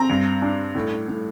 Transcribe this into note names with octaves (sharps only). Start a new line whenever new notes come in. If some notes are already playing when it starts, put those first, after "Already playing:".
Already playing: C4 A#5
G2
D4
A2
A2